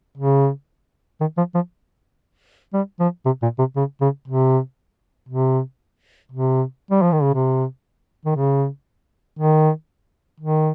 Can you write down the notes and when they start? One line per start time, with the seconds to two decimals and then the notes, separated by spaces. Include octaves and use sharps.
0.18 C#3
1.20 D#3
1.37 F3
1.55 F3
2.73 G3
3.00 F3
3.25 C3
3.42 A#2
3.58 C3
3.76 C#3
4.01 C#3
4.28 C3
5.29 C3
6.32 C3
6.91 G3
7.02 F3
7.12 D#3
7.23 C#3
7.34 C3
8.25 D#3
8.36 C#3
9.39 D#3
10.40 D#3